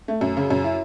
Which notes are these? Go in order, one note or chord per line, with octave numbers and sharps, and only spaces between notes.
A3
F#2
C#3
F#2
E4